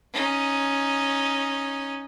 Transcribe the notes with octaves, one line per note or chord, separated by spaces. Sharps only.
C#4 D#4